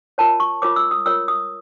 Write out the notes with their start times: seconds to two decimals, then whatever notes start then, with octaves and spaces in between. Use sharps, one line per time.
0.18 F4 A#4 C#5 A5
0.40 C#6
0.62 F4 A#4 C#5 D6
0.76 E6
0.91 D#6
1.06 F4 A#4 C#5 E6
1.28 D#6